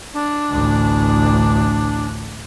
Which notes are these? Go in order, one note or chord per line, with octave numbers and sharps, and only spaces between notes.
D4
A1 D2